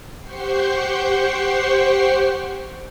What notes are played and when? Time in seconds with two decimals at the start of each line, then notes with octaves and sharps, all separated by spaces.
0.20 G4 C5 F#5 G5 C#6 C7